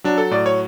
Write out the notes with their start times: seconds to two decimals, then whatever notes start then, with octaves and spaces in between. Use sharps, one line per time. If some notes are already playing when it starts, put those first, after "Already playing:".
0.04 F#3 D4
0.18 A4
0.31 A2 D5
0.46 C#5